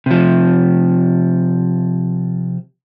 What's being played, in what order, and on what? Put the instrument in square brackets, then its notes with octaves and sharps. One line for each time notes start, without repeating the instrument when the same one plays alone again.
[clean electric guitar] C3 F3